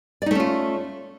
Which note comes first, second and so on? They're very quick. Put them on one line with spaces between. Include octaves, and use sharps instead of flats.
D5 D#4 A3 C#4 F4